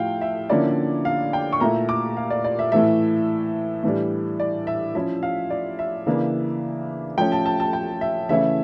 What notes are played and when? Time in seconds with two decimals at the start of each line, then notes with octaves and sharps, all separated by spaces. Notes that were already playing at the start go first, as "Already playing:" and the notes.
Already playing: A2 F3 A3 F5 G5
0.21 E5
0.49 D3 F3 A#3 C#4 E4 D5
1.05 F5
1.33 G5
1.53 C#6
1.60 A#2 A3 E4 A#5
1.89 D6
2.17 F5
2.30 D5
2.44 D5
2.59 E5
2.72 A2 E3 A3 E5
3.84 A2 E3 G3 D4
4.40 D5
4.67 E5
4.95 F3 C#4 E4 E5
5.23 F5
5.50 D5
5.79 E5
6.06 C#3 E3 A#3 D4
7.18 F3 A3 C#4 G5
7.32 A5
7.46 A5
7.60 A5
7.73 G5
8.01 E5
8.29 C#3 E3 A3 C#4 E4 E5